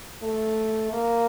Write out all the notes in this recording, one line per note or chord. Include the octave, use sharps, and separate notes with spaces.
A3
A#3